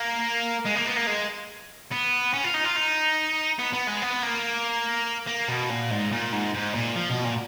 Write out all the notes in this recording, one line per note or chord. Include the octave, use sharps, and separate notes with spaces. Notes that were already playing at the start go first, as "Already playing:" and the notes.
Already playing: A#3
G#3
A#3
B3
A#3
G#3
B3
C#4
F4
D#4
F4
D#4
B3
B3
G#3
B3
A#3
A#3
B2
A#2
G#2
A#2
G#2
G#2
A#2
F3
B2
A#2